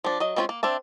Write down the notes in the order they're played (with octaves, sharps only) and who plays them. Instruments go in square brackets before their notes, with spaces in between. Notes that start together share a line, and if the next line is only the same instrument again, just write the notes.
[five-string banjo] F3 D4
F#3 D#5
G#3 C4 C#4 E4 F4
A#3
C4 D4 E5 A5